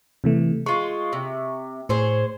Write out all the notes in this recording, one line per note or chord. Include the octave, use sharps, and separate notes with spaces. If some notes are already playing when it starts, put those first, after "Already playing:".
C3 E3 A3
G#3 F4 C#6
C3
A2 G#4 C5 C#5